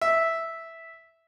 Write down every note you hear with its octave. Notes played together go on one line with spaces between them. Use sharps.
E5